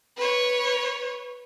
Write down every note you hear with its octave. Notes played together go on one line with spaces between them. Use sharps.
B4 C#5